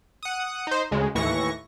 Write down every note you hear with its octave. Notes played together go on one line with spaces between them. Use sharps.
F#5 D#6
D#4 C5
D2 C#3 G#3
D#2 A2 E3 C#6 A#6